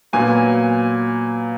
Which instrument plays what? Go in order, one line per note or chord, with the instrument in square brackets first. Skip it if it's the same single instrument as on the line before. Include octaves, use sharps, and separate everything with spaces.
[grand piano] A#2 F#3 B3 G#5